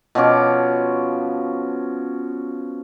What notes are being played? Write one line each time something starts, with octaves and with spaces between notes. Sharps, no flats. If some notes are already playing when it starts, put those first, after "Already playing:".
B2 F3 C#4 D6